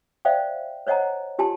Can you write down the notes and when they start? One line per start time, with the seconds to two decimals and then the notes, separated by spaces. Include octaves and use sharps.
0.25 C5 D5 E5 F5 G5
0.87 C5 C#5 D#5 F#5 G#5 A#5
1.39 F4 G4 G#5 A5 C6